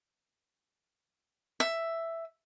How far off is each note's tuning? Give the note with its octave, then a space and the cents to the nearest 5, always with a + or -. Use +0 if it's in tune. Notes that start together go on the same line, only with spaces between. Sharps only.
E5 +5